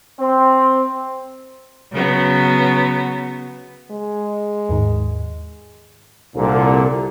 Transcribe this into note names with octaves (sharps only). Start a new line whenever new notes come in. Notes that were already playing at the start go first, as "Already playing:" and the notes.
C4
C#3 F#3 B3
G#3
D#2 G#2 D#3
C2 A#2 D3